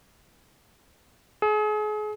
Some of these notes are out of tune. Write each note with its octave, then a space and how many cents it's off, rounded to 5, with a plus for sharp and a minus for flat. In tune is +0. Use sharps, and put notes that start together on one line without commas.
G#4 +35